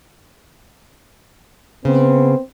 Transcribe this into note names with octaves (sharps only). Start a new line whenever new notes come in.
C#3 B3 C4